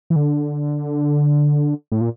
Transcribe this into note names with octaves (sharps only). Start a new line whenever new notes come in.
E3
D3
A2
A#2